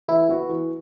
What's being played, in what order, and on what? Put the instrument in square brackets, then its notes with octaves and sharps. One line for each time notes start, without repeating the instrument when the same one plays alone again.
[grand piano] E3 [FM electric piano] E4
[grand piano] B3 F#4
E3